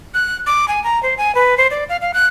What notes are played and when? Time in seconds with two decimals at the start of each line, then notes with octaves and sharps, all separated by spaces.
0.14 F#6
0.46 D6
0.68 G#5
0.84 A#5
1.03 C5
1.18 G#5
1.35 B4
1.57 C5
1.71 D5
1.89 F5
2.02 F5
2.14 F#6